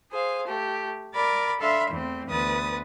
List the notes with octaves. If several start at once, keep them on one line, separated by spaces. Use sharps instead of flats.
G#4 C5 F5
A3 G4
A#4 D5 B5 D6 A6
D4 A4 E5 F5 B5 C6
E2 E3 A3 C4
D2 B3 B4 D#6 A6